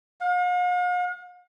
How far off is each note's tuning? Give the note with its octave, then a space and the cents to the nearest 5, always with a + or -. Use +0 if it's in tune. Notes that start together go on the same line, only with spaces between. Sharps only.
F5 +45